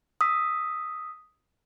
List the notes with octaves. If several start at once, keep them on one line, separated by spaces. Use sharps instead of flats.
D#6 E6 B6